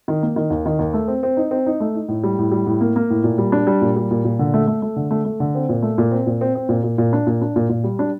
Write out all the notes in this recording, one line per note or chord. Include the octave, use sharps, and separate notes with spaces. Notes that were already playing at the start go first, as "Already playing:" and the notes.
D#3
A#3
D#3
D#2
D#3
D#2
A3
C4
C4
D#4
C4
D#4
A3
D#4
A2
G3
A2
G3
A2
A#3
A#3
A2
A#2
G3
D4
G3
A#2
G3
A#2
A#2
D3
A3
A3
A3
D3
A3
A3
D3
C4
A#2
A3
A#2
C4
A#2
C4
C4
A#2
A#2
A#2
D4
A#2
D4
A#2
A#2
G3
D4